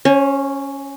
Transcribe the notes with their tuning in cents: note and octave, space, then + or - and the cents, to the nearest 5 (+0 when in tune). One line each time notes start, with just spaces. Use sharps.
C#4 +0 C5 +45